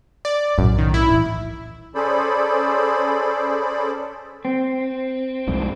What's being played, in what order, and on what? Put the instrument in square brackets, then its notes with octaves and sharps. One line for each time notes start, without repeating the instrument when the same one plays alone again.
[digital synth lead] D5
[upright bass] B1 A2 [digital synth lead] F#2
[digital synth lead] D#3
E4
[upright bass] A2 E3
[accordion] C#4 G#4 A4 C5 D5 B5
[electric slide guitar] C4
[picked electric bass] C2 F2 G#2